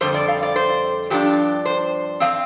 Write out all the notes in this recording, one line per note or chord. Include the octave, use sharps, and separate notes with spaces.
F2 D3 G3 C5
D5
F5
D5
C5
G2 F3 D4 G4
C5
F3 C4 F5